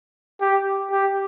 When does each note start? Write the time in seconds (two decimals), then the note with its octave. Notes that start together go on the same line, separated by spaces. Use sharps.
0.41 G4
0.91 G4